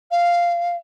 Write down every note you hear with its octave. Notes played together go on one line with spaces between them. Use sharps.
F5